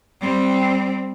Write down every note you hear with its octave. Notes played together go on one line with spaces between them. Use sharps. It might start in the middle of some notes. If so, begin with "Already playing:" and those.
G3 C4